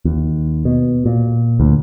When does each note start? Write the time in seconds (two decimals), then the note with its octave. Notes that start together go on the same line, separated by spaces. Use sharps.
0.05 D#2
0.65 B2
1.06 A#2
1.60 D2